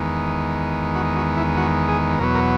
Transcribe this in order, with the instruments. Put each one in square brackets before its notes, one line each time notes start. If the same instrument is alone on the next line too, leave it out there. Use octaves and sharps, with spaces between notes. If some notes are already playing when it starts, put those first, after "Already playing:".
Already playing: [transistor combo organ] E2 D#3 G#3 B3
F#4
F#4
E4
F#4
G#4
E2 B2 F#3 B3 A#4
A#4